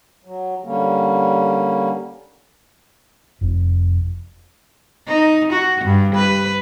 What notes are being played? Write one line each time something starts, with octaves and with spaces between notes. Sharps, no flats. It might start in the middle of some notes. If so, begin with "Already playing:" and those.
F#3
D3 G3 A#3 C#4
F1
D#4
F#4
G2
B4